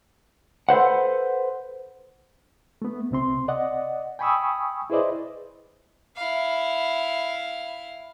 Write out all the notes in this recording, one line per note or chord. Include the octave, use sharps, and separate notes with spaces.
A4 B4 C5 F#5
A3 B3
C2 C3 C4 C6
D5 D#5 F#5
G5 G#5 B5 C#6 D#6 E6
E4 G#4 B4 C5 D5 D#5
E4 F5